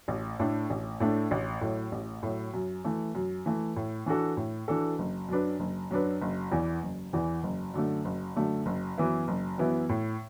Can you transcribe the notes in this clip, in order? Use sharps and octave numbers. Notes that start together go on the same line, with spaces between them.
A1
A2 A3 D4
A1
A2 A3 D4
A1
A2 F#3
A1
A2 F#3
F#2
E3 A3
F#2
E3 A3
A2
E3 D4 F#4 A4
A2
E3 D4 F#4 A4
F#1
F#2 F#3 D4 B4
F#1
F#2 F#3 D4 B4
F#1
E2 E3
F#1
E2 E3
F#1
F#2 D3 A3
F#1
F#2 D3 A3
F#1
F#2 E3 B3 E4
F#1
F#2 E3 B3 E4
A2